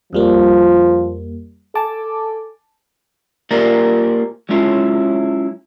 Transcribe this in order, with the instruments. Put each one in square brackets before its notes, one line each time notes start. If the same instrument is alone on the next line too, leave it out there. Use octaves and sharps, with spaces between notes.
[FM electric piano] F2 G3 A#3 [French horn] F3
[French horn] A4 [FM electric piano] G#5 A5 D6
[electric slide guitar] A#3 F4 G4 A#4 C5 D5
F#3 G#3 C#4 E4 F4